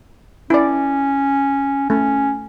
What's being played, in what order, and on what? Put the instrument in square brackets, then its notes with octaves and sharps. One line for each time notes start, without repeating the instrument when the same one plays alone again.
[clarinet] C#4 [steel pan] E4 D5
[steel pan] A3 [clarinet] C#4